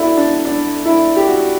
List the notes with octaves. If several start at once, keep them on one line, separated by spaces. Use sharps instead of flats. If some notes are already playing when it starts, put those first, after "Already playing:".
Already playing: D4 E4 F#4 A4
D4
D4
E4
G4
F#4